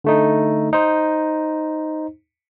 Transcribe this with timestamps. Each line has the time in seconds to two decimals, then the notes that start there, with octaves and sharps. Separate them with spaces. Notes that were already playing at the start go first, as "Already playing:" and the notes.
0.04 D3 A3 D#4
0.73 D#4 C5